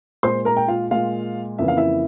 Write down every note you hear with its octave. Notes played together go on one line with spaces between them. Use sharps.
A#2 G#3 C5 C6
A#4 A#5
G5
F4 F5
A#2 G#3 F4 F5
F2 C#3 E3 A#3 E5
F5
E4 E5